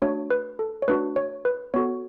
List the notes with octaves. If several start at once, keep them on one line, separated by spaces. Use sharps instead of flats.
A3 D4 F#4 C#5
B4
A4
C#5
A3 D4 F#4 B4
C#5
B4
B3 F#4 A4 C#5